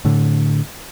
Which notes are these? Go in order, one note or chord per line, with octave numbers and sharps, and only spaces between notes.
A2 D3